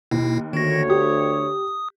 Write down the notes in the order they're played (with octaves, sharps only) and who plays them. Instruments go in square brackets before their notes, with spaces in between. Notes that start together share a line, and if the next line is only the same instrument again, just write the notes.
[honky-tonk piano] D#2 [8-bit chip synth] B2 E4
[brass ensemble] D2 C#5 [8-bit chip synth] D#3 A#6
[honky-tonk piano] G4 [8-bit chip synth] D#6